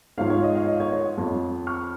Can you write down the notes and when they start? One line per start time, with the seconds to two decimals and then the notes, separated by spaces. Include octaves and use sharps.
0.18 G#2 F3 C#5 F5
0.30 C#5
0.43 D#5
0.55 C#5 F5
0.68 D#5
0.80 C#5
0.92 C#5
1.17 F2 F3
1.67 C#6 F6